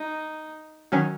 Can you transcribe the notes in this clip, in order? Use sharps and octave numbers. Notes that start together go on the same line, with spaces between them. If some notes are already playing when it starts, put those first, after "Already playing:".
Already playing: D#4
D#3 F#3 C#4